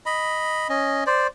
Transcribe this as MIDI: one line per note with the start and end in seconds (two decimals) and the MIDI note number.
0.06 0.68 75
0.06 0.68 83
0.69 1.04 61
0.69 1.04 75
1.06 1.27 72
1.06 1.27 74